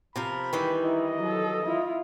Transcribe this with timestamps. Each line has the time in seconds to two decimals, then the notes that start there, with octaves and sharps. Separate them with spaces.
0.16 C3 F3 A#4 B5
0.53 D#3 E3 G3
0.82 D#4 E4 D#5
1.22 F#3 A4
1.65 E4 F4